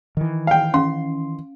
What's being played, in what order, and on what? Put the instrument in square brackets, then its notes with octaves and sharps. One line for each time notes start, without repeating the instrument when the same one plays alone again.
[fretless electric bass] D#3 E3
[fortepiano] F5 G5
[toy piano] C#4 F5 [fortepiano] C6